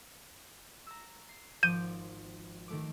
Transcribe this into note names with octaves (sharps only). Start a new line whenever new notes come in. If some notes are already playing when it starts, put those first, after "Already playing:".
A#5 E6
C7
G#1 F3 D6 G6 D#7
D#3 A3 D6